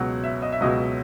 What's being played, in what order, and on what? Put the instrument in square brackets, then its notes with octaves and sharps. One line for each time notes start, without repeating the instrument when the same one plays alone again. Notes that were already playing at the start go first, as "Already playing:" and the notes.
Already playing: [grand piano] C#2 B2 F#3 F#5
E5
D#5
E5
C#2 B2 F#3 D#5